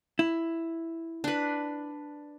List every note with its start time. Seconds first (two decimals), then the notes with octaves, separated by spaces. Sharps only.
0.19 E4
1.24 D4 B4